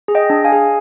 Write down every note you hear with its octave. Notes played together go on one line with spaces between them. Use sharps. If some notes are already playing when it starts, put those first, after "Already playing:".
G#4
D#5 G5
D4
F5 G#5
G#4